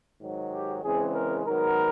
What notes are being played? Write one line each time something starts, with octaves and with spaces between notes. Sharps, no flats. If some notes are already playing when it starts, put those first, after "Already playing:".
G#2 D#3 F#3
G4
C#3 E3 G#3 C4 G#4
A#4
G#2 D#3 F#3 B3 A#4